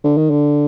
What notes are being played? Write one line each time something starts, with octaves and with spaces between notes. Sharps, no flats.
D3
D#3
D3